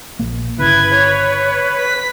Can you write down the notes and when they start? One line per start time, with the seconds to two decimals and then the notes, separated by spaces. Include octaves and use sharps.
0.19 A#1 A#3
0.59 G1 C#3 E4 B4 G#6
0.95 C#5
1.80 B6